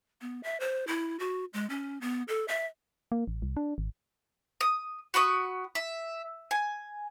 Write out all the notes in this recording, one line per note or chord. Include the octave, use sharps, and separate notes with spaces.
B3
E5
C5
E4
F#4
G#3
C#4
B3
A4
E5
A#3
A1
C2
D4
G#1
D#6
F#4 B5 C#6 D#6
E5
G#5